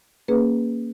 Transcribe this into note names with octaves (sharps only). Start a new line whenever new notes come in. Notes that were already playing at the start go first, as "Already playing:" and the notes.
A#3 C#4 G#4 B4